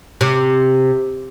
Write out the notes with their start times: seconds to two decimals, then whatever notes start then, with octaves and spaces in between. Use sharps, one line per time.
0.21 C3